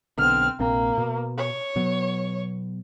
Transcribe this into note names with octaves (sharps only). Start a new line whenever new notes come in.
B1 B2 D3 C4 F6
A#1 C3 A#3 C4
B2
C#5
B2 F#3 B3